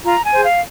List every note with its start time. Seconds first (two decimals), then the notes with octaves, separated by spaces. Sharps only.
0.04 F4 A#5
0.24 G#5
0.33 G#4 C5
0.43 F5